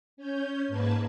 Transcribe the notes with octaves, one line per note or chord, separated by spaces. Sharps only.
C#4 C#5 G6
G#2 A#3 B4 A5 G#6